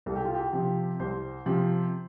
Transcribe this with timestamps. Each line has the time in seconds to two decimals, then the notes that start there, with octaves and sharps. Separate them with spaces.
0.06 C2 A4
0.16 G4
0.25 F4
0.34 G4
0.53 C3 F3
0.99 C2 C5
1.46 C3 F3